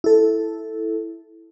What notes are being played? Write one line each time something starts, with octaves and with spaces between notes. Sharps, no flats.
E4 A4